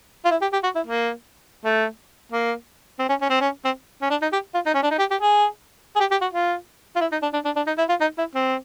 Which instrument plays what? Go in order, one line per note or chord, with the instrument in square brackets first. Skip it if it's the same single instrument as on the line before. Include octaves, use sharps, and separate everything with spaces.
[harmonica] F4
E4
G4
G4
F#4
E4
A#3
A3
A#3
C4
C#4
C#4
C4
C#4
C4
C#4
D4
D#4
G4
F4
D#4
C#4
D4
D#4
G4
G4
G#4
G#4
G4
G4
F#4
F4
F4
E4
D#4
D4
D4
D4
D4
D#4
E4
F4
D#4
E4
C4